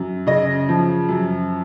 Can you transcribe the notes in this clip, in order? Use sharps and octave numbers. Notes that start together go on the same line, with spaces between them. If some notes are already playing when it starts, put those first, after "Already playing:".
Already playing: F#2
C#3 D#5
F3
F#2